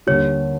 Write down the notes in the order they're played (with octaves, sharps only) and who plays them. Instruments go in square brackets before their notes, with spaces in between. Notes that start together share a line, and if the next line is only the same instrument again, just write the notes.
[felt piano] D#2 D3 G3 [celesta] C#5